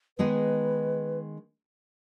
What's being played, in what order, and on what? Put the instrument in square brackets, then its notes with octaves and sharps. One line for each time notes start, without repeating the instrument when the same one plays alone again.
[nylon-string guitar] D#3 G#3 B3 D#4 G#4 [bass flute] B4